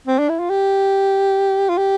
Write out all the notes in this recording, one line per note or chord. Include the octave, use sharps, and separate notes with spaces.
C4
D4
E4
F4
G4
F4
G4